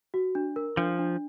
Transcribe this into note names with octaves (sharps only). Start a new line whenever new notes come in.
F#4
D4
A#4
F3 D4
D4